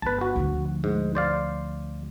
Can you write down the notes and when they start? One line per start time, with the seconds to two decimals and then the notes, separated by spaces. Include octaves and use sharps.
0.02 G1 D#3 B4 A5
0.21 F#4
0.36 D2 F3
0.84 G#2
1.15 C5 D5 F5